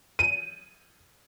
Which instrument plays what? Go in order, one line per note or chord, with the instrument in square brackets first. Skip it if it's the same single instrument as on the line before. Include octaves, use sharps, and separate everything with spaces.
[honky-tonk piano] D#7